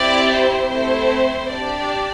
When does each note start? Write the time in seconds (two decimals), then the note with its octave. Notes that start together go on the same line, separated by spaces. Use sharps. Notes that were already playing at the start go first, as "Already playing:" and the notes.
Already playing: C4 E4 G4 D5
0.30 C5
0.69 A3 C4 E4 C5
1.48 D4 G4 D5